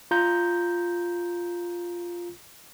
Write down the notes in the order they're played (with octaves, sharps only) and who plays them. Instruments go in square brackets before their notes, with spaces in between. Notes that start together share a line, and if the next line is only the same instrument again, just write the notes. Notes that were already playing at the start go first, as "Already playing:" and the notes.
[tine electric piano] F4 A#5 G6